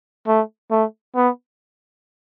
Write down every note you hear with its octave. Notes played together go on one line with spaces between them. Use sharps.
A3
A3
B3